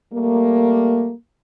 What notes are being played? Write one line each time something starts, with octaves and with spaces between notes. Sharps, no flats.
G3 A3 A#3